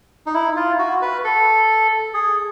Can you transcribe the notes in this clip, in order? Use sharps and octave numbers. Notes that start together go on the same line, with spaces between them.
D#4
E4
F4
F#4
B4
A4
G#4